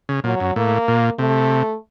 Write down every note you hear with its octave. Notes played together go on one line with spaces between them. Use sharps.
C#3
A#2 F#3
F#2
A2 A#3
A#2
C3 A3